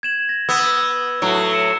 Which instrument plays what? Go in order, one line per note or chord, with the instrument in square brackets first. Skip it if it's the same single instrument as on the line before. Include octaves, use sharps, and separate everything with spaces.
[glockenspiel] G#6 E7 F#7
A#6
[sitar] B3 [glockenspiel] E6
[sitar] A2 F#3
[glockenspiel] E6 C#7 E7